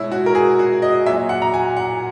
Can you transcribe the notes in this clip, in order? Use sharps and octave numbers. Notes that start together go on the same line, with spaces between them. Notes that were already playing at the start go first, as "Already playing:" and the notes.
Already playing: B2 G#3 E4 C#5
F#4
A#4
G#4
F#4
D#5
A#2 F#3 E5
F#5
A#5
G#5
F#5